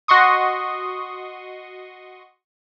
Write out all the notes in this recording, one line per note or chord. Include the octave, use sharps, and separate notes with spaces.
F#4 D#5 C6 C#6 D#6